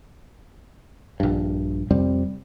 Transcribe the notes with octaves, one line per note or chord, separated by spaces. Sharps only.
A#1 G2
F2 C3 G3 C4